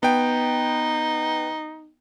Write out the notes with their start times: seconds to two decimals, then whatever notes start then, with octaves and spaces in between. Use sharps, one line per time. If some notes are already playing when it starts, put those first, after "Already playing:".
0.03 B3 D#4 G5